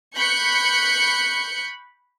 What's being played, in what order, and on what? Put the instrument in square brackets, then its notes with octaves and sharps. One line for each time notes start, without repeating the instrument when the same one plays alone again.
[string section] B5 C#6 F#6 G6 C#7